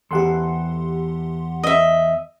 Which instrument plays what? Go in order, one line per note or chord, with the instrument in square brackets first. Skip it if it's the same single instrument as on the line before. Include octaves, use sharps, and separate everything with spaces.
[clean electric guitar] E2 A4 [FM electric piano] G4 F#5 C6
[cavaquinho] D#5 E5